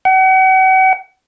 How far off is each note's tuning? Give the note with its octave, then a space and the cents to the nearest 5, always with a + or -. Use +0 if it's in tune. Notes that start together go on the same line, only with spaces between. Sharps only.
F#5 +40